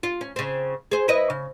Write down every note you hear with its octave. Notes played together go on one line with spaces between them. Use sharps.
F4
C#4
C#3 C4
G#4 C5
E4 B4 D#5
C#3